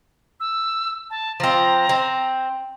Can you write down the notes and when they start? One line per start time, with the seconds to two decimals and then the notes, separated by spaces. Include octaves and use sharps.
0.40 E6
1.10 A5
1.40 F3 C4 A#5
1.89 C4